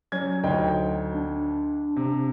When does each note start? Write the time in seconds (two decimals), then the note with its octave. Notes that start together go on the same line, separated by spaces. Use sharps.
0.12 F#3 C#4 G#6
0.43 D2 D#4 G5
1.14 D4
1.96 C3